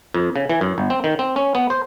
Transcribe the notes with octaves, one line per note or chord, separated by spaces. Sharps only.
F2
C#3
E3
F#2
G1
C4
D#3
C4
C#4
B3
C5